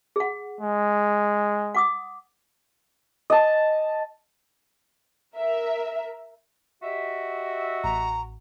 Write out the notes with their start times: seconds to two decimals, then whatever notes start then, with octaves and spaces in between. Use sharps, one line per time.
0.16 G#4 F#5
0.61 G#3
1.75 F#5 D6 D#6
3.30 D#5 A5
5.36 A#4 E5
6.82 F#4 G4 D#5 E5
7.84 A1 A#5